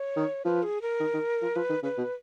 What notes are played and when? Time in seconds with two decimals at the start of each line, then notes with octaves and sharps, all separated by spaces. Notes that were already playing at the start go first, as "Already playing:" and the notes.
Already playing: C#5
0.16 D#3
0.45 F3 B4
0.63 G#4
0.82 A#4
1.00 D#3
1.14 D#3
1.42 F3
1.56 F3 B4
1.70 D#3
1.83 C#3 B4
1.98 B2